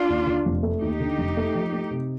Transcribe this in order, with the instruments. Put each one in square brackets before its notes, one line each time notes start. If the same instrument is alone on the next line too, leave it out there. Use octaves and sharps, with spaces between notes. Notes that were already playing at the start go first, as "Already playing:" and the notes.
Already playing: [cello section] D4 F4
[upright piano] D#2
D3
F1
A3
[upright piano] D#2 [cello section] D#4 G4
[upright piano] D3
F1
A3
F3
A3
C3